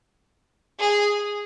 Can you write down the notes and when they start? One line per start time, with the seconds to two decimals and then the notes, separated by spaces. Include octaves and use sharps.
0.79 G#4